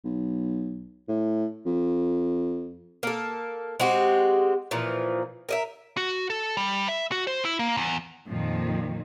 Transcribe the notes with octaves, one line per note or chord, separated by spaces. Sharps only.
B1
A2
F2
A#3 A4
G#3 C4 F#4 G4
A#2 E3 F3
A#4 D#5 E5
F#4
A4
G3
E5
F#4
C5
E4
A#3
E2
F2 A#2 D#3 F3